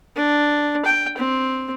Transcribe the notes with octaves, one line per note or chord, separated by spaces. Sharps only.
D4
G5
C4